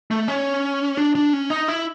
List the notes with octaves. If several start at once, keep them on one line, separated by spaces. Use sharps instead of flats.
A3
C#4
D4
D4
C#4
D#4
E4